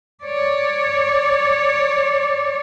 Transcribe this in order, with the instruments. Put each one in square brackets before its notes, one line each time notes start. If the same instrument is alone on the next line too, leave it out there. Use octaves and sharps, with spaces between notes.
[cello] C#5 D5